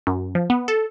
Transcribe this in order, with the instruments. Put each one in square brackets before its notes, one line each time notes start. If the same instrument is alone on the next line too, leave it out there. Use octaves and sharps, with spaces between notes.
[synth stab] F#2
F3
B3
A4